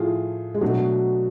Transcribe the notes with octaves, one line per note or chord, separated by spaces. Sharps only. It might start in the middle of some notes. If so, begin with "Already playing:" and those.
Already playing: A2 F3 A3 F4 G#4
G#3
B2 F#3 A3 D4 F#4